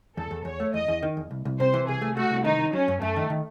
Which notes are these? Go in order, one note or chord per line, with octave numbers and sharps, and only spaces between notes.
E2 A4
E2
E2 C#5
A3
E2 D#5
E2
D#3
E2
C2
C2
C3 C5
E3
C2 G#4
A3
A3 F#4
C2
D#3 D#4
D#3
F#3 C#4
F#2
F#2 A3
D#3
D#3